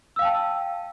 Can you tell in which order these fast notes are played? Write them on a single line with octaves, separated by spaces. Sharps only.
E6 F5 G5 A5